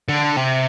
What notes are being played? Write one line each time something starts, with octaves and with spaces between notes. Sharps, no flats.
D3
C3